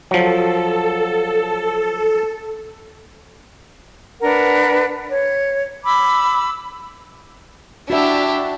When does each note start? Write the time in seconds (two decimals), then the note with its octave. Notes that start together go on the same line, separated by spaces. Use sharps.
0.11 F3 F#3 A4
4.22 D4 A#4 B4 F#5
5.08 C#5
5.85 B5 D6 E6
7.90 D4 E4 F#4 G4 E5